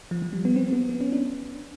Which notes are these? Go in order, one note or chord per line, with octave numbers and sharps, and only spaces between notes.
F3
F3
G3
B3
C4
B3
B3
C#4
D4